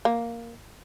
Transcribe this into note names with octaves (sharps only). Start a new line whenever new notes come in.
A#3